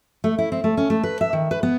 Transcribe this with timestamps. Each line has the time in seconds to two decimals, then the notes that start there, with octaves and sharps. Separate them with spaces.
0.24 A3
0.38 E4
0.52 C4
0.64 A3
0.77 C#4
0.90 A3
1.03 B4
1.21 E5
1.33 D#3
1.51 B4
1.63 B3